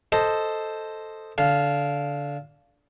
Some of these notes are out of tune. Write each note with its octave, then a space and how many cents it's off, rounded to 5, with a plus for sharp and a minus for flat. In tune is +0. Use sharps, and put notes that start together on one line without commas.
A4 +0 C5 +0 D#5 +0
D3 -20 F5 +0